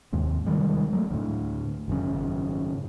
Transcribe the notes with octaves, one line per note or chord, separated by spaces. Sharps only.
D#2 G#2 C3
C3 D#3 G3 G#3
F#3 G#3 A3
D2 A2
G#1 F#2 C#3